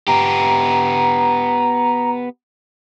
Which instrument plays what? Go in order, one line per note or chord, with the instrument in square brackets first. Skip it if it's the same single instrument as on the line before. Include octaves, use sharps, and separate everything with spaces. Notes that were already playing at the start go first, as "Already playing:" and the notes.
[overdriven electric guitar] B3 G4 [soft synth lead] A#5